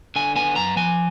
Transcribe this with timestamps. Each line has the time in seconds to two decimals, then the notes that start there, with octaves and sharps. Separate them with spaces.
0.16 D3 G#5
0.36 B3 G#5
0.56 F#2 A#5
0.77 F3 G#5